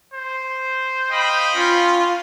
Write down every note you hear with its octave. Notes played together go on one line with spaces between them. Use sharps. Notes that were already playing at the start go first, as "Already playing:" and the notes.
C5
D#5 F5 G5 B5
C#4 F4